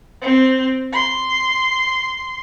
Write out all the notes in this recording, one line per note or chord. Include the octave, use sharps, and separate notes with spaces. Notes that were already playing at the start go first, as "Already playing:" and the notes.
C4
C6